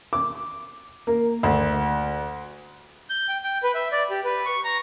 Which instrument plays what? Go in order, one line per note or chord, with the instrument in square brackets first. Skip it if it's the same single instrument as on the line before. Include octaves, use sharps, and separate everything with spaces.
[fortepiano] D6
A#3
D2
[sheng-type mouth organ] G6
G5
G5
B4
E5
D5
G4
B4
C#6
A#5